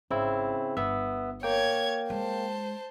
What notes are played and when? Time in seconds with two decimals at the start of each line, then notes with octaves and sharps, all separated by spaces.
0.11 G#1 C#3 C4 E4
0.77 G1 B3 E5
1.43 A#3 C#5 G5 G#6
2.10 G#3 C5 A5